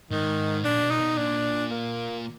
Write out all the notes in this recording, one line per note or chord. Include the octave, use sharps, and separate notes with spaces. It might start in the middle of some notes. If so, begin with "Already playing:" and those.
G#2 D#3
A#2 D4
B2
A#2 D#4
B2
A#2 D4
A#3